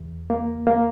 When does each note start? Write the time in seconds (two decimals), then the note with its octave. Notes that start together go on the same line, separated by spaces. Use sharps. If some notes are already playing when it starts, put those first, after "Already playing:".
Already playing: E2
0.30 A#3
0.67 A#3